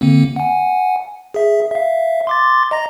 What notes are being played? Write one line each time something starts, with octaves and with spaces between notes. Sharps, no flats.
D3 A#3 C4
F#5 G#5
G#4 E5
E5 F5
C6 D6 A6
D#5 A#5 A#6